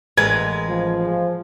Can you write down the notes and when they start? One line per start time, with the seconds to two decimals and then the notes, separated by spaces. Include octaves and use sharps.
0.17 A1 G#3 A#4 B4 G#6
0.69 F3